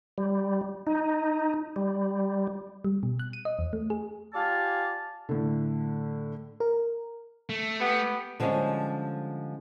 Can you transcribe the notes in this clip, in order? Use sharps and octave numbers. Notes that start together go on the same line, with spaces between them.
G3
D#4
G3
G3
B2
F#6
D#7
D#5
E2
A3
G#4
F4 G4 D5 F5 G#5 A5
A2 D3
A#4
A3
B3 G4
D3 F3 G3 G#3 C#4